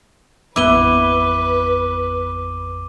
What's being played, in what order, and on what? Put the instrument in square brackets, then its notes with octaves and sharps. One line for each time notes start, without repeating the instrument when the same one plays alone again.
[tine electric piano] A1 F2 [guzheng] B3 E4 [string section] B4 [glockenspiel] D6 D#7 G7